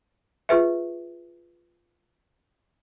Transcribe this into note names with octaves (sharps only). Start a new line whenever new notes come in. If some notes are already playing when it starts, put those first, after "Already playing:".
F4 G#4 B4 E5